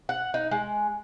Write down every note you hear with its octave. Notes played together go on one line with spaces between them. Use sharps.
F#5
D#4
G#3